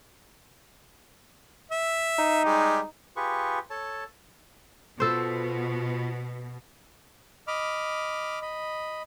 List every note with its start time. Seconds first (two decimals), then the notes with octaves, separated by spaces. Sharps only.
1.71 E5
2.19 D#4
2.45 G3 G#3 G4
3.16 F4 G4 G#4 B4 C#6
3.70 A4 C#5 A5
5.00 B2 F4 A4 C5
7.48 D#5 B5 D6 F6
8.42 D#5 B5